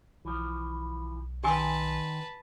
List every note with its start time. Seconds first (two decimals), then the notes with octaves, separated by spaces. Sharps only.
0.25 B1 E3 F3
1.44 D#3 G4 B4 G#5 A5 C6 E6